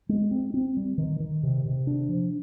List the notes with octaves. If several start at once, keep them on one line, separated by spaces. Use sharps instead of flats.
G#3
C4
C4
G3
D#3
D#3
C3
C3
D4
F3